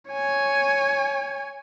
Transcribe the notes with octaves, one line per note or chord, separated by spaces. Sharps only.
C#5 G#5